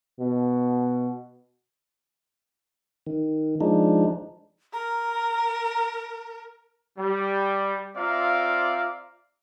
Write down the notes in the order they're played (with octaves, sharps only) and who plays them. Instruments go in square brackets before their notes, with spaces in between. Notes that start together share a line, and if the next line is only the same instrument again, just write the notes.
[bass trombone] B2
[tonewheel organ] D#3
F3 G#3 D4 D#4
[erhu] A#4 [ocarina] A#5
[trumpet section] G3
C4 F4 D5 E5 F5 A#5